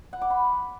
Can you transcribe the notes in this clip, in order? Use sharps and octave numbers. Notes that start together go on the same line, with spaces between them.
F#5
D6
B5